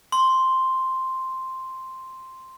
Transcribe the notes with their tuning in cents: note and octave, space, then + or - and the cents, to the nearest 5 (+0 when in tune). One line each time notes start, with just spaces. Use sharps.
C6 +0